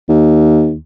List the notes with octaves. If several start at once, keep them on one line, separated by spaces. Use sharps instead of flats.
D#2